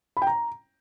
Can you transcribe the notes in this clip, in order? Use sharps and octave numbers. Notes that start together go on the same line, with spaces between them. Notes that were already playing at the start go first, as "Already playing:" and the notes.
B5
G5
A#5